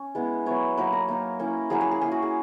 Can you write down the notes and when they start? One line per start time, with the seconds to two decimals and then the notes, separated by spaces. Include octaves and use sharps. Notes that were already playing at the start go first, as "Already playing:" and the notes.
Already playing: C#4
0.15 G#3 B3 E4
0.46 F#3 B3 E4 C#5
0.77 F#3 A#3 D#4 B4
0.93 A#4
1.09 A#3 D#4
1.39 A#3 C#4 E4
1.70 F#3 A#3 C#4 E4 G#4
1.81 G#4
1.91 G#4
2.01 A#3 E4 G#4
2.12 F#4
2.22 G#4